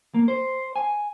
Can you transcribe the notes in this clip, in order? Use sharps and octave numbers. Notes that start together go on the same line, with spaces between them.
A#3
C5
G#5